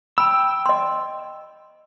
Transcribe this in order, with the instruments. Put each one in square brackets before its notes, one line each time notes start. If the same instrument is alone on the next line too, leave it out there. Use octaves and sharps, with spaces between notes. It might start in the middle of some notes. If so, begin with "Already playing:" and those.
[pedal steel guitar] G5 E6 [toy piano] B5
[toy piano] D#5 C6